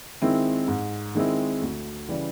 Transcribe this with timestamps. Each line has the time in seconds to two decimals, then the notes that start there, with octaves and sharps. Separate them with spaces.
0.22 D#3 G#3 C4 E4
0.68 G#2
1.15 D#3 G#3 C4 E4
1.62 D2
2.09 C#3 E3 G3